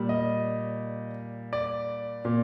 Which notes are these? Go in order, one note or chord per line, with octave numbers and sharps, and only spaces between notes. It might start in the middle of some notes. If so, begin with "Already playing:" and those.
Already playing: A#2 G3
D#5
D5
A#2